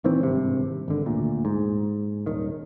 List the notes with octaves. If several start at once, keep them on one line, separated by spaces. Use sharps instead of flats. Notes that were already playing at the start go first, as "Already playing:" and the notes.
A#1 D#3 E3 C4
G#1 G2 C3
G#1 D3
D2 A#2
G#2
D#1 D#3